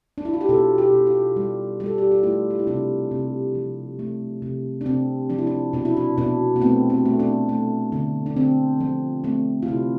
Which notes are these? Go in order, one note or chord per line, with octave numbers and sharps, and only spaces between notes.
D4
E4
F4
G4
B2 A4
G4
B2
F4
G3
G3
A4
G4
F4
A3 E4
F4
E4
C3 D4
C3
F3
A3
C3
D4
C3 C4
F3 D4
E4
D4
B2 D4
E4
D4
B2 D4
B3
A3 C4
C4
A3
D4
A3
D3
D4
D3 C4
F3
A3 C4
F4
C3 E4